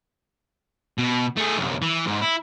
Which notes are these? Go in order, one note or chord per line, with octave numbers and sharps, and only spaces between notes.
B2
A3 G#4
C2 F#2
E3
G#2
E4